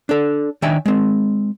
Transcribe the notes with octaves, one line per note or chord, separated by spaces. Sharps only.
D4 A4
D#3 D4 E5 G5 G#5
G#3 C4